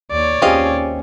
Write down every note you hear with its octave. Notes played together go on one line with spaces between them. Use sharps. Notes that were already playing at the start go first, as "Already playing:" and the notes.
D#2 C#5 D5
D#2 C4 C#4 F4 G4 G#4 D#5 F5